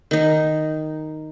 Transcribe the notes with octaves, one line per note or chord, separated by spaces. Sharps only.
D#3 D#4